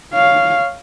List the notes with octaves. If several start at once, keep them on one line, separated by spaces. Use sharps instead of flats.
C#5 F5